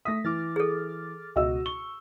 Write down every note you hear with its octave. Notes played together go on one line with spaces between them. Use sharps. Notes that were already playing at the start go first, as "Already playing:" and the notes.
A3 E5 D#6 A#6 B6
E3 D6 F6 A6
G#4 A4
C#2 B2 F#4 D#5 E6
C#6 G7